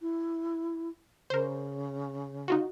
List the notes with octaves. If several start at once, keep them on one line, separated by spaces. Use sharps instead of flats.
E4
C#3 A#4 C5
D#4 F4 F#4